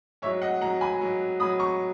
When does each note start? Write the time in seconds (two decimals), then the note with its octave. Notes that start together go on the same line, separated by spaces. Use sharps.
0.22 G#2 C#5 E5
0.26 F#3
0.42 D#5 F#5
0.61 G#2 F#3 F#5 A#5
0.81 G#5 B5
1.01 G#2 F#3
1.39 G#2 F#3 B5 D#6
1.59 A#5 C#6